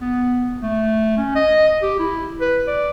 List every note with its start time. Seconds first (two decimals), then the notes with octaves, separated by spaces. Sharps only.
0.01 B3
0.62 A3
1.18 C#4
1.35 D#5
1.82 G4
1.99 E4
2.41 B4
2.68 D5